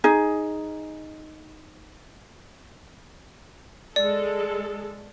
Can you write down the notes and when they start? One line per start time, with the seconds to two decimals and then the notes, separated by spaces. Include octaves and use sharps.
0.04 D#4 G#4
3.96 G#3 A4 D5